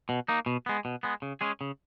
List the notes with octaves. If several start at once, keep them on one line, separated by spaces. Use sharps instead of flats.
B2
A#3 D#4
B2
G#3 B3
B2
G#3 B3
C#3
G#3 C#4 G#4
C#3